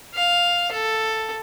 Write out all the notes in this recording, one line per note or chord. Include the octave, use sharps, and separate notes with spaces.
F5
A4